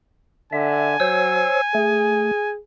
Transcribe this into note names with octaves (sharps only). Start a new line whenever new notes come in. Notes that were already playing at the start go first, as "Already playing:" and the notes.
D3 E5 G#5
F#3 C5 C#5 E6
A3 G#4